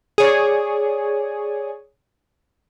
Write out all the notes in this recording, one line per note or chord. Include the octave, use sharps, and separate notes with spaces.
G#4 C#5 D5